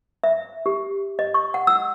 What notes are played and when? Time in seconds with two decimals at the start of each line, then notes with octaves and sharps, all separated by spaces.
0.24 E5
0.66 G4
1.19 D#5
1.34 C#6
1.54 F#5
1.67 E6